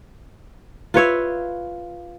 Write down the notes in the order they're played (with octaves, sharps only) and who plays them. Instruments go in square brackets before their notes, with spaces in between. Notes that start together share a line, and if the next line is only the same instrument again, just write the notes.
[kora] F4 B4 C#5 E5